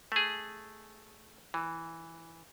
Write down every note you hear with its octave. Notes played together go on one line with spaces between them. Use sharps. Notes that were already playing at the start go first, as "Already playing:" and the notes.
A3 G#4
E3